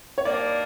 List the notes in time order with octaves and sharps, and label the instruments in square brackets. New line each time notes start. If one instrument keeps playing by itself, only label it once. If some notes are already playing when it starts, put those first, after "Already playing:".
[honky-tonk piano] C#5
[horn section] G2 D#3 G3 A#3 [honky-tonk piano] D5